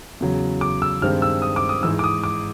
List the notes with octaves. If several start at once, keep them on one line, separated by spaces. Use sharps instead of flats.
E2 C#3 F#3
D6
E6
G2 D#3 G#3 C4 F6
E6
D#6
D6
D#6
G#2 E3 G#3 E6
D6
D#6
D6